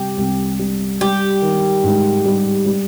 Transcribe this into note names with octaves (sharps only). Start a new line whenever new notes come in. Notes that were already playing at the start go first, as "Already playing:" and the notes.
Already playing: C3 G3 G4
C2
G3
G3 G4
D#3
G#2
G3
G3